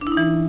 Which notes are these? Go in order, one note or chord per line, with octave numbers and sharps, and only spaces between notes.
D4
E4
D#4
E3